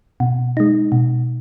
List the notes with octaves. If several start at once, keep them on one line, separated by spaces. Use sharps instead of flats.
B2
G#3 D#4
B2